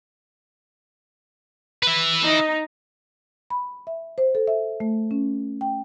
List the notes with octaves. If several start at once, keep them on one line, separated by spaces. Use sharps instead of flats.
B4 E5
D#4
B5
E5
C5
A4
E5
A3
C#4
G5